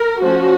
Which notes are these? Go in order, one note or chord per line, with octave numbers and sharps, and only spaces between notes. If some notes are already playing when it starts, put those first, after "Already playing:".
Already playing: A#4
F3 A3 C#4 F#4